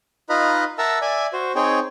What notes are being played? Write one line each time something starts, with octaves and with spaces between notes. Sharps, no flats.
D#4 F4 B4 D#5 A#5 B5
A#4 E5 F#5 A5 A#5 E6
D5 E5 G#5
F#4 C5
C4 D#4 G#4 C#5 G5